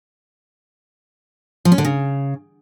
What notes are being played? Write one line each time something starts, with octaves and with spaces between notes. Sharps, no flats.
F3
C#4
D3
C#3